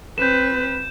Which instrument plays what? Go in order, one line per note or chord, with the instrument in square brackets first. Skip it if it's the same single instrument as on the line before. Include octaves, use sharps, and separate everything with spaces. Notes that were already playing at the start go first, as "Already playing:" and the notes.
[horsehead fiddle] C4 B4 [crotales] G6 E7